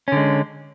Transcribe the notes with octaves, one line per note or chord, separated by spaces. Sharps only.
D3 G#3 C#4